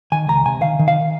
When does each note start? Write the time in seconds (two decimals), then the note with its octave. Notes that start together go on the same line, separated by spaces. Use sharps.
0.12 D#3 G#5
0.28 C#2 A#5
0.45 C3 G#5
0.62 D#3 F5
0.79 D#3
0.88 F5